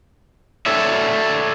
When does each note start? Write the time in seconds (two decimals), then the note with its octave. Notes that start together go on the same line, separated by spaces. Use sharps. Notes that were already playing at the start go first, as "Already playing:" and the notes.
0.66 A4 C#5 D5 E5